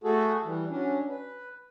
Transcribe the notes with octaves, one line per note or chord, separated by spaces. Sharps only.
A3 F#4 G#4 A4
E3 G3
F#3 C#4 D4
B4